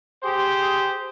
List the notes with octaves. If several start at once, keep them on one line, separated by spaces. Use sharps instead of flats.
G4 G#4 C5